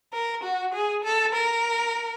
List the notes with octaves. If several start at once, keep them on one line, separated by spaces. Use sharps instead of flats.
A#4
F#4
G#4
A4
A#4